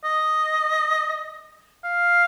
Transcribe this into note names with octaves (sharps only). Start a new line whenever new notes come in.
D#5
F5